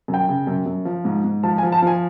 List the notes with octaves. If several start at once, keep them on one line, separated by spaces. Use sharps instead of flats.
F#2
G5
C#3
F#2
F#2
F3
G#2
G#2
F3 A5
G#5
F3
A5
F3 G#5